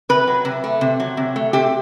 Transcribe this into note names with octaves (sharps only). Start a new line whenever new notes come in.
C3 B4
F#3
C3
A3
C3
F#3
C3
A3
C3 G4